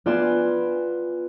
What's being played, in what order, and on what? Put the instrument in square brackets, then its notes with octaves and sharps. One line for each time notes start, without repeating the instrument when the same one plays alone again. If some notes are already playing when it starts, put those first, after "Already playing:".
[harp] B3 F4 D5 G#5 E7